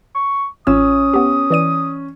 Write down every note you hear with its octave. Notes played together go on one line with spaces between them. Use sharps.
C#6
A1 C#4 F4 D#6 E6
B3 G4
E3 D5 D#7